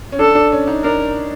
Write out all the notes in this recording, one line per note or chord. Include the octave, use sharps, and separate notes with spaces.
C#4
D4 A4
D4
C#4
D#4
D4 A#4